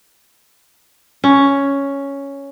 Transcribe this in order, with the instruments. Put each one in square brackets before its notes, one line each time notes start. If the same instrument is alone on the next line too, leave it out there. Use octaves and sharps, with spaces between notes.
[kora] C#4